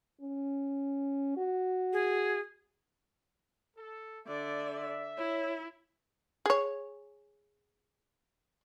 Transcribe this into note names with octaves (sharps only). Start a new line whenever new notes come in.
C#4
F#4
G#4
A4
D3 D5 E5
E4 C#5
G#4 C#5